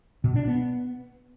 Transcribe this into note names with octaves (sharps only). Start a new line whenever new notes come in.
B2
D4
B3